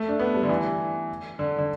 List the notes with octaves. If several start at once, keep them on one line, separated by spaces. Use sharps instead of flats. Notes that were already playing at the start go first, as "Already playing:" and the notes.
Already playing: A3
D4
B3
G3
D3
E3
D3
D3